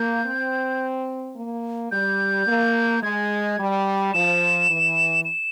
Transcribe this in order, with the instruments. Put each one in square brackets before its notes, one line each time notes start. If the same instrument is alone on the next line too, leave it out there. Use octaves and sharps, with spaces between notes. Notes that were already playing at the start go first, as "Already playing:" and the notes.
Already playing: [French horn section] A#3 [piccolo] G6
[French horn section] C4
A#3
[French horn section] G3 [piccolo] G6
[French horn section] A#3
[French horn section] G#3 [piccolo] G#6
[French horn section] G3
[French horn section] F3 [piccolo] E7
[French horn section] E3
[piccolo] E7